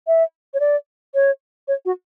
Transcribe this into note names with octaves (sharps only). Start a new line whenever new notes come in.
E5
C#5
D5
C#5
C#5
F#4